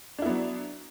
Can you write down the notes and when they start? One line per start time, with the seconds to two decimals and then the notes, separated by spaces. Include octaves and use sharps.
0.18 D4
0.22 E4
0.26 B3
0.29 F#3